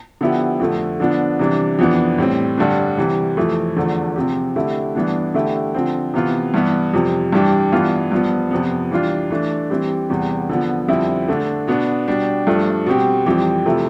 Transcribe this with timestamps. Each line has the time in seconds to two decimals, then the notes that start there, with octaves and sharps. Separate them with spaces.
0.21 D3 F3 B3 E4 G4
0.60 F2 D3 A3
1.00 D3 F3 B3 D4
1.39 C3 E3 G3 D4
1.79 F2 E3 B3 D4
2.18 A2 G3 C4
2.58 G2 D3 G3 D4
2.97 C3 E3 G3
3.37 F2 E3 A3
3.76 E2 D3 F3 A3
4.16 C3 F3 C4 G4
4.56 D3 A3 E4 G4
4.95 G2 E3 B3 D4
5.34 D3 A3 E4 G4
5.75 D3 F3 C4
6.14 C3 E3 B3 F4
6.54 G2 E3 B3
6.94 F2 C3 G3
7.32 G2 E3 G3 D4 G4
7.72 G2 E3 B3 F4
8.12 G2 F3 B3
8.51 F2 C3 F3 B3
8.91 E3 G3 D4 F4
9.30 E3 A3 D4
9.70 E3 G3 C4 G4
10.09 E2 C3 G3 B3
10.49 D3 F3 B3
10.88 F2 D3 G3 C4 E4
11.28 D3 A3 D4
11.67 B2 B3 D4
12.08 B2 G3 D4 G4
12.47 G2 F3 A3 D4
12.86 B2 G3 C4 G4
13.26 F2 E3 G3 C4 G4
13.66 C3 F3 A3 E4